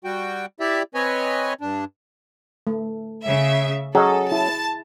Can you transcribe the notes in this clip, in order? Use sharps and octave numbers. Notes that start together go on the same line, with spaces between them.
G3 F#4 G5
E4 G4 D5 E5
C4 B4 C#5 D#5 G#5
G2 D4
A3
C#3 E5
F#3 C#4 G#4 A4 D#5
E4 A5